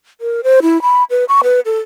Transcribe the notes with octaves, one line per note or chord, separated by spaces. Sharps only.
A#4
C5
E4
B5
B4
C#6
B4
A4